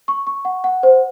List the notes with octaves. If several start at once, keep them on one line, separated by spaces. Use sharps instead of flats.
C#6
C#6
F#5
F#5
C5